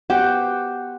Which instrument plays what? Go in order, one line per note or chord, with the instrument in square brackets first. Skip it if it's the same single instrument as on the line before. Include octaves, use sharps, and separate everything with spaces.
[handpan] B3 F#5 [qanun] G4 C5